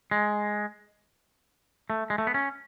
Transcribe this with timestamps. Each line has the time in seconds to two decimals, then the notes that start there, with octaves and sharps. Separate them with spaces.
0.11 G#3
1.90 A3
2.10 G#3
2.18 A3
2.27 B3
2.34 C#4